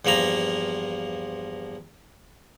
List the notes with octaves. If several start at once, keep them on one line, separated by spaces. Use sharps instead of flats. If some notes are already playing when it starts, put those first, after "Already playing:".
E2 G2 F3 A#3 A#5